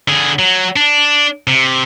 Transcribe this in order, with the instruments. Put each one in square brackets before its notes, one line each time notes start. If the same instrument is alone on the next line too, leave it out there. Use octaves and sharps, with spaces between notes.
[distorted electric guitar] D3 G#4
F#3
D4
C3